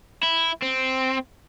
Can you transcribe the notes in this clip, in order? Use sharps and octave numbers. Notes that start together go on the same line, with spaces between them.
E4
C4